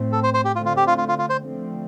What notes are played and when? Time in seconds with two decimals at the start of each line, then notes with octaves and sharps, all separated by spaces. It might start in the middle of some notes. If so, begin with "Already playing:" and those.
Already playing: A2 A3 C4
0.12 A4
0.23 C5
0.34 C5
0.45 G4
0.56 D3 A3 C4 F4
0.66 F4
0.77 G4
0.87 F4
0.98 F4
1.08 F4
1.18 F4
1.30 C5
1.40 D3 F3 A3 C4